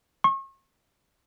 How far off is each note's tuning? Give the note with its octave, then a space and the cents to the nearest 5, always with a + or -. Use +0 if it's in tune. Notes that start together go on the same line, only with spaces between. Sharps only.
C#6 -40